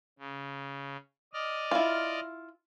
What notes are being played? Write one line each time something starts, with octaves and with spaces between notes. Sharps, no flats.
C#3
D5 D#5 F6
E4 F4